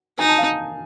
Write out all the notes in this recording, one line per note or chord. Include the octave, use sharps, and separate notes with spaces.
D#4 G#5
A5
F5